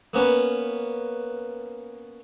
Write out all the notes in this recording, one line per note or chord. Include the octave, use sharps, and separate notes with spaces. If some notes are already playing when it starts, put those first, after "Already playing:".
A#3 B3 C#4 B4